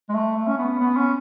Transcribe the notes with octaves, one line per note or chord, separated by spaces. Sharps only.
G#3
A3
A3
C#4
B3
B3
C#4